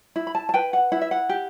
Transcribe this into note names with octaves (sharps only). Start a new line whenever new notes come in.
E4
B5
A5
A5
B4 G5
F#5
E4 F#5
E5
F#5
G4